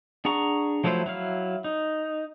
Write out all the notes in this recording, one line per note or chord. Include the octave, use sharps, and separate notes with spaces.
D4 G#4 F#5 A#5 C#6
F3 F#3 A3 E4 C5
F#3 E4 F5
D#4